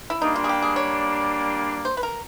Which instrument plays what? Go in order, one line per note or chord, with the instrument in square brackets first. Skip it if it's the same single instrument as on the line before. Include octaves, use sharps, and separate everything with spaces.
[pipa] E4
[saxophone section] G3 A#3 D4 [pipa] D#4
[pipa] F4
G#4
G4
G#4
C#5
C5
B4
A#4